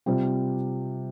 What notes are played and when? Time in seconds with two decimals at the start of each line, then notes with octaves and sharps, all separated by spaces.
0.06 C3 G3 C4 F4